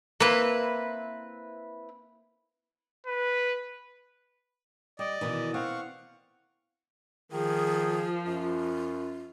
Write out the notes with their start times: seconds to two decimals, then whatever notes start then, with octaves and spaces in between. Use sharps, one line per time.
0.20 A#3 C4 E4 B4
3.07 B4
4.99 G3 D5 D#5
5.21 B2 D#3 E3
5.54 C4 F5 F#5 C#6
7.32 D#3 F3 G#4
8.27 F#2 F4